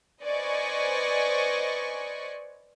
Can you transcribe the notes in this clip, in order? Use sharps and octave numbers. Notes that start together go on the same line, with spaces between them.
B4 C5 D5 D#5 G#5 C#6